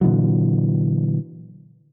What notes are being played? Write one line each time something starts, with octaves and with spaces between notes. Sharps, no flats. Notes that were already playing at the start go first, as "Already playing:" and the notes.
A#2 D3 E3 F#3